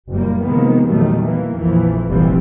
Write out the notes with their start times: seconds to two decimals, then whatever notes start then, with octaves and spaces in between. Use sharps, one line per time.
0.11 F#1 A#2 G3 A#3
0.41 C3 D#3 F3 G#3 A#3 B3
0.87 E2 A#2 D#3 F#3 G3 A3
1.22 E3 A#3
1.56 A#1 F2 E3 F3
2.08 F1 A#1 E3 F3 G3 C4